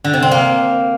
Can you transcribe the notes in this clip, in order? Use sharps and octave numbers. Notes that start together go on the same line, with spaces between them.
D3
C3
C4
A#3